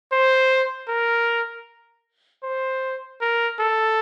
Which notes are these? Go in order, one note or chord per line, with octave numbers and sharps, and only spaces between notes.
C5
A#4
C5
A#4
A4